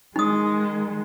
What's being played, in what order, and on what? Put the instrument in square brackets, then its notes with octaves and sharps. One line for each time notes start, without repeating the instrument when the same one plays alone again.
[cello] D#3 G#3 [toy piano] D#4 D#6